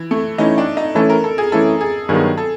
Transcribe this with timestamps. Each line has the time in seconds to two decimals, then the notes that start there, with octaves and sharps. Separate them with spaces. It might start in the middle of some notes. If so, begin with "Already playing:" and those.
Already playing: E3
0.11 A3
0.38 E3 A3 C#4 D#4 E4
0.58 D4
0.77 D#4
0.95 E3 A3 C#4 E4 A4
1.10 A#4
1.24 A4
1.38 G#4
1.52 E3 A3 C#4 E4 A4
1.81 G#4
2.09 G2 D#3 F#3 B3 G#4
2.38 A4